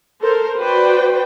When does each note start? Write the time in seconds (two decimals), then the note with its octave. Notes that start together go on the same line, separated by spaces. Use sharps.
0.22 A4 A#4 C5
0.57 F#4 B4 C5 D5 G5